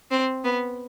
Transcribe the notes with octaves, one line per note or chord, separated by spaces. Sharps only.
C4
B3